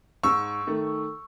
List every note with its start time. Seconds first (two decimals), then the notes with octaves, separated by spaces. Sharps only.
0.23 G#2 C#6 E6
0.67 D#3 A3